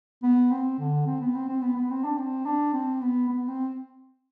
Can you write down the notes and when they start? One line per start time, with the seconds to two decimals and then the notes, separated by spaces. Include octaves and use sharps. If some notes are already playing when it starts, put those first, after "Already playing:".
0.23 B3
0.51 C4
0.79 D3
1.07 C4
1.21 B3
1.35 C4
1.49 C4
1.62 B3
1.76 B3
1.91 C4
2.04 D4
2.18 C4
2.46 D4
2.74 C4
3.02 B3
3.29 B3
3.48 C4